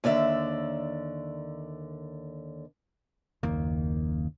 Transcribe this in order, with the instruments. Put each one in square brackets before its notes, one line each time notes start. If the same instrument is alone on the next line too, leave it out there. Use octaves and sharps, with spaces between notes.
[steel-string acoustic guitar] D#2 D3 D5 E5
[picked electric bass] F#1 D#3 A#3 [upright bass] D#2